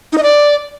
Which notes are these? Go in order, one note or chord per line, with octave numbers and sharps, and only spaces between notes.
D#4
D#5
D5